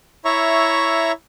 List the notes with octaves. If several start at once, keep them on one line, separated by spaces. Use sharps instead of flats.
E4 C#5 E5 A#5 C#6